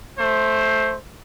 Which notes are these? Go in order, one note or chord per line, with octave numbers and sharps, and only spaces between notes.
A3 C5